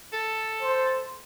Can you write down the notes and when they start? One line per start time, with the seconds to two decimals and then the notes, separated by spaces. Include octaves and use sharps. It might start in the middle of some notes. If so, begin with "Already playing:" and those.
0.13 A4
0.62 C5